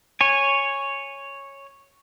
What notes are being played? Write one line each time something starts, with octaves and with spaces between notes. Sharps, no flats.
C#5 G#5